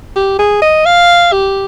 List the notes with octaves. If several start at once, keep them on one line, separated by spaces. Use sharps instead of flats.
G4
G#4
D#5
F5
G4